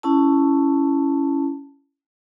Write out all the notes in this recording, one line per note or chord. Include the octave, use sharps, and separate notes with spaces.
C#4 E4 A5